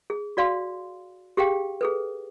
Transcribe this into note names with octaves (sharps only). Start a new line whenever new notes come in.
G#4
F#4 D5 F5 C6
G4 G#4 F5 G5
G#4 A4 B4